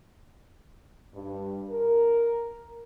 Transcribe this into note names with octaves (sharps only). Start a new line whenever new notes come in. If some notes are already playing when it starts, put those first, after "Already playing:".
G2
A#4